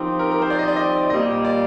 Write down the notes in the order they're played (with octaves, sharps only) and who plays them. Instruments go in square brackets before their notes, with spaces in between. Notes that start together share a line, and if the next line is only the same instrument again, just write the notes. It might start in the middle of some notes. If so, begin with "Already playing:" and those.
Already playing: [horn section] F3 C4 D#4 G4 [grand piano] A#4
[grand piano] A#4
A#4
C5
D5
D#5
D5
D#5
[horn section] A#2 G3 A#3 [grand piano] D#5
[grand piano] D5